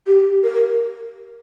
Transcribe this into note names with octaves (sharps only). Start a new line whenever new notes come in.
G4
A#4